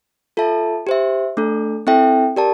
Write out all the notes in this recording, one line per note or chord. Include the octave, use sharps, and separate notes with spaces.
F4 A4 E5 A5
G4 C5 E5
A3 D4 A4
C4 E4 A4 E5 G5
G4 A#4 D5 A5